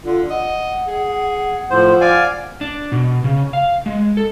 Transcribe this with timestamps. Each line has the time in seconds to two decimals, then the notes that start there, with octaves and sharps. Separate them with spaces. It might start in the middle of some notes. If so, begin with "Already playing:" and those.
0.05 D3 F4
0.30 D#5 F#5
0.87 G#4
1.70 A2 F3 C5
2.01 D5 F5 G#5
2.61 D4
2.92 B2
3.24 C#3
3.53 F5
3.86 G#3
4.17 A4